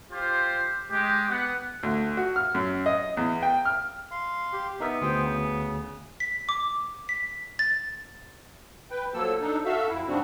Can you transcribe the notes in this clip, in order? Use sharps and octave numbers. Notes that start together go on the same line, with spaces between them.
F4 G4 C5
G#3 G4
B3 F#5
D2
F#4
F6
F#2
D#5
E2
G5
F6
F5 C6
G4
B3 D#4 A#4 E5
D2 G#4 C5 G5
C#3
B6
D6
B6
A6
B4 G5
F3 F#3 A#3 A4 E6
D4 D#4 A4
F#4 A4 E5 F5 E6
F2 E4
G#2 C#3 G3 C4 D4 F#4